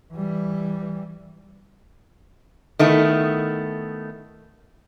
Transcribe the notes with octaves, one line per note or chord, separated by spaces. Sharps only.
E3 G3
D#3 A3 B3 E4